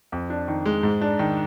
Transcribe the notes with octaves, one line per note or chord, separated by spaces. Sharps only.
F2
D4
D#3
G#3
G#2
D4
D#3